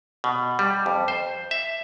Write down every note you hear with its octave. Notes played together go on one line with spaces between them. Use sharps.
B2
G3
F2
C5
E5